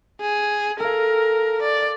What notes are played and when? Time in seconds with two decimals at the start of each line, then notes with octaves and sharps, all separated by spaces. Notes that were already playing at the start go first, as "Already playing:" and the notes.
0.21 G#4
0.80 A4 A#4 F5
1.62 D5